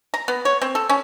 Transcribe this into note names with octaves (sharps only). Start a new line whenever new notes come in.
A#5
B3
C#5
C4
A4
C#4